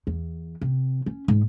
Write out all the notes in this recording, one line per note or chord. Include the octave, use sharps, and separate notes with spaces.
E2
C3
C#4
G#2